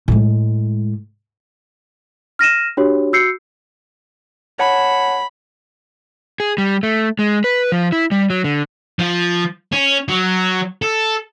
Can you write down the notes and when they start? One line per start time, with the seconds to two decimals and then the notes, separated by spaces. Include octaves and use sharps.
0.08 A2 G#3
2.39 F6 A#6 D#7 E7
2.77 D4 F#4 G4 C#5
3.13 F#4 E6 G6 C7 C#7
4.59 C#5 F#5 A5 B5
6.40 G#4
6.58 G3
6.83 A3
7.19 G#3
7.44 B4
7.72 F3
7.92 E4
8.11 G3
8.30 F#3
8.44 D3
8.99 F3
9.73 C#4
10.08 F#3
10.82 A4